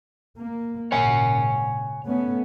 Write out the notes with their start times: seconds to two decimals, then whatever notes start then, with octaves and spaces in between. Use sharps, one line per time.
0.37 A#3
0.92 G#1 A#2 C#3 C#5 F#5 G#5
2.05 A3 B3 C#4